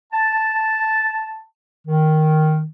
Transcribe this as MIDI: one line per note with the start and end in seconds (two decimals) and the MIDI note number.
0.13 1.44 81
1.87 2.64 51